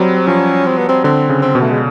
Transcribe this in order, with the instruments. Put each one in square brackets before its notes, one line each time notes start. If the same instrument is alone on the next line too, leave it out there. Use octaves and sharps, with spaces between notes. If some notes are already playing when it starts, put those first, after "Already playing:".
Already playing: [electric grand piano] F#3 G3 [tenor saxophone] C4
[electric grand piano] F3 [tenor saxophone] C#4
[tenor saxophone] C4
B3
C4
[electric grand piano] D3 [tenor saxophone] C4
[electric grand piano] C#3
[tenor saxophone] C4
[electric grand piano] B2
[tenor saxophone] A3
G#3